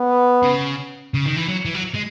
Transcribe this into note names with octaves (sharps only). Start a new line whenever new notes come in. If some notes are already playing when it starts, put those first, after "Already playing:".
Already playing: B3
C#3
C#3
D#3
E3
F#3
E3
F#3
G#3